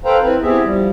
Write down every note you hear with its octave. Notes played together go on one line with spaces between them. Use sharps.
A4 B4 C5 F5 G5 A#5
C4 E4 B4
B3 C4 E4 G4 G#4 E5
F3 G3